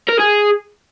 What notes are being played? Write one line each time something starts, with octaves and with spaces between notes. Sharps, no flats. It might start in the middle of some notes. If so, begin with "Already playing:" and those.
A#4
G#4